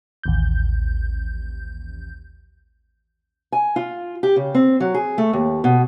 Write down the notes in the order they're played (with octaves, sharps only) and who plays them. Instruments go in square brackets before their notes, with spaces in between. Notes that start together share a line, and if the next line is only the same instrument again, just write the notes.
[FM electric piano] A1 D#2 G6
[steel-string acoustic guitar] G#5
F4
G4
C#3
C4
F#3
G#4
A3
D#2
B2